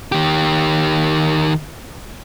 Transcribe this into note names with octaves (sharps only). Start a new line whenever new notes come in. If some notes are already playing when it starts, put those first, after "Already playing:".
D#3 G4